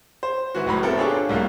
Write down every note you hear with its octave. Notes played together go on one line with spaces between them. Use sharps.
C5
G#2 E3 F#4
F#1 A2 F#3 B5
B3 C4 E4 A4 A#4
D4 F4 G4 G#4 C#5
C2 A2 A#3 F4